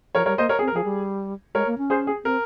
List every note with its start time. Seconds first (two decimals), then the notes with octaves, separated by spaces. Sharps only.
0.14 F3 A#4 C#5
0.26 G3 A#4 C#5
0.38 A#3 C5 D#5
0.49 A#4 C#5
0.59 G#4
0.61 C4
0.67 A#4
0.74 F3 G#4
0.84 G3
1.55 G#3 A#4 C#5
1.67 A#3
1.78 C#4
1.90 G#4 C5
2.07 G#4
2.24 C4 A#4